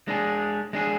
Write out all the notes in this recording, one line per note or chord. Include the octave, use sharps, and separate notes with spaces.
G#3 D4 G#4
G#3 D4 G#4